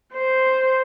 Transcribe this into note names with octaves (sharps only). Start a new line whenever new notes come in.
C5